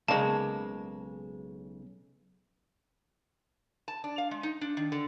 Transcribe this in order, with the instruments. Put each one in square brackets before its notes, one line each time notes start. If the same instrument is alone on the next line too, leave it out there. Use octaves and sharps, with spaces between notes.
[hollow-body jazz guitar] B1 C#3 [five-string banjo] G#3 A#3 [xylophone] A5
[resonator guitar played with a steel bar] A5
D4
F5
G#3
D#4
D4
D#3
D3